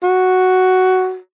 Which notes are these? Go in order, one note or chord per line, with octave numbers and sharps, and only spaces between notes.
F#4